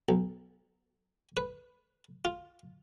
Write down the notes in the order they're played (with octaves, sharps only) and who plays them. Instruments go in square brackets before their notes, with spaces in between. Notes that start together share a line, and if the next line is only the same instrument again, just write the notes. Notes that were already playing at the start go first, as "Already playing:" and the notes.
[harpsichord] B1
B4
F4